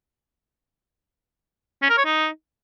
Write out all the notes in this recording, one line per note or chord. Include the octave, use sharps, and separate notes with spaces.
C#4
A#4
C#5
D#4